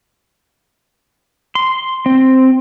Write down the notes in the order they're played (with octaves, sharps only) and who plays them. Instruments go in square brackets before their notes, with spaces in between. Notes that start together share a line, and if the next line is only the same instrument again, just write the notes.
[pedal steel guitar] C6
C4